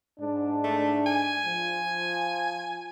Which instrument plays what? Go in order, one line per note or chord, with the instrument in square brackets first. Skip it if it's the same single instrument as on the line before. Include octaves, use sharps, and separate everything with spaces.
[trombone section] G#2 D4
[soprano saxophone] A3
G#5
[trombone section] F3